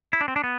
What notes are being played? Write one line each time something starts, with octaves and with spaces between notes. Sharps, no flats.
E4
D4
C4
D4
B3